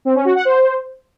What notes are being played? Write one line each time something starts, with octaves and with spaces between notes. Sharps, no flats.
C4
C#4
F#4
F#5
C5